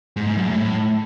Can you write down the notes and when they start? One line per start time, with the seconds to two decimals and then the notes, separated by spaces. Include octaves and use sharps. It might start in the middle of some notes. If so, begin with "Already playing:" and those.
0.16 G#2
0.27 G#2
0.37 F#2
0.47 A2